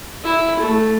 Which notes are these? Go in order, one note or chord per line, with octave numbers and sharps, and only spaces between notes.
E4
A3